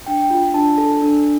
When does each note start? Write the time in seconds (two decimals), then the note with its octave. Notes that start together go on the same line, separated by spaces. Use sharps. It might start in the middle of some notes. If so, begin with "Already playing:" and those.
0.06 D4 G5
0.31 F4
0.54 D4 A5
0.78 A4
1.02 D4